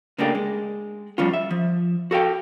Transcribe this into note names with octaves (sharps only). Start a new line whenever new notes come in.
C#3 A3 A#3 D4 G4
G#3
F3 G3 C#4 F4
E5
F3
F#4 A4 F5 G5